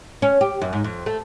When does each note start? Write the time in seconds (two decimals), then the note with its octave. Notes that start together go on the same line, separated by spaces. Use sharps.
0.22 C#4
0.41 G4
0.62 F#2
0.73 G#2
0.84 F2
1.06 A3